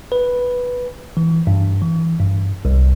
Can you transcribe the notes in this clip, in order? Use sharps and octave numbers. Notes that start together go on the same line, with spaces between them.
B4
E3
G2
E3
G2
C2